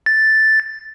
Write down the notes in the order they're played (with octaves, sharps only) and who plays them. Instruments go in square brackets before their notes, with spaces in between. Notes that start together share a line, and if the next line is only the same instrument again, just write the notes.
[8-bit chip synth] A6